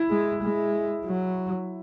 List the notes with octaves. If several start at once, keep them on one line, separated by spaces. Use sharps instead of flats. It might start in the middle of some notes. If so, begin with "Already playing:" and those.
Already playing: E4
G#3
G#3
F#3